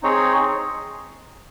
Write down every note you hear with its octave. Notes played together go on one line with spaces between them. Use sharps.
C4 D#4 G#4 C#5